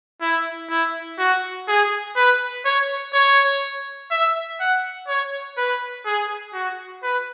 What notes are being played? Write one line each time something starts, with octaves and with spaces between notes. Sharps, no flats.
E4
E4
F#4
G#4
B4
C#5
C#5
E5
F#5
C#5
B4
G#4
F#4
B4